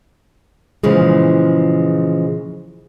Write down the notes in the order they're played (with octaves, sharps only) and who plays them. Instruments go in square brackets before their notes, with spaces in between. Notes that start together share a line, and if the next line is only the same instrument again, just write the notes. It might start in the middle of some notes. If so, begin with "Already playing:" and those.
[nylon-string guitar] A#2 C#3 E3 F3 G#3